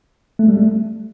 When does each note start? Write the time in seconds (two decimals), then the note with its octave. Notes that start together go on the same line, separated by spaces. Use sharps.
0.39 A3
0.48 G3
0.57 A3